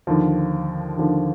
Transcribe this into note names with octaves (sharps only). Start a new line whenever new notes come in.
D#2 D3 F3
D#2 D3 F3